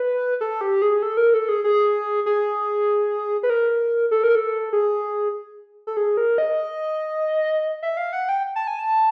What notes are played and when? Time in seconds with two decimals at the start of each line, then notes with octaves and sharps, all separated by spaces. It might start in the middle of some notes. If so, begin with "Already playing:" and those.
Already playing: B4
0.41 A4
0.61 G4
0.82 G#4
1.03 A4
1.17 A#4
1.34 A4
1.49 G#4
1.64 G#4
2.26 G#4
3.43 B4
3.50 A#4
4.11 A4
4.24 A#4
4.35 A4
4.73 G#4
5.87 A4
5.97 G#4
6.17 A#4
6.38 D#5
7.83 E5
7.97 F5
8.13 F#5
8.29 G5
8.56 A5
8.67 G#5
8.79 A5